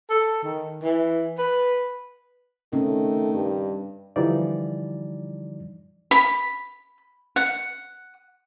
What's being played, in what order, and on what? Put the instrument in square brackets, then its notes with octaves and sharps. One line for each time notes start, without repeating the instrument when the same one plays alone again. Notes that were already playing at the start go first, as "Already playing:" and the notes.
[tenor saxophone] A4
D#3
E3
B4
[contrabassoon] D#3 [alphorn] A3 [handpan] C4 C#4
[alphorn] G2
[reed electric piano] D3 E3 F3 G3 D#4 D5
[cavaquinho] B5
F#5